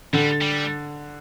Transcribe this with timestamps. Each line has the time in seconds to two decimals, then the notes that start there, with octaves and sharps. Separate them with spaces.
0.13 D3 G3
0.41 G3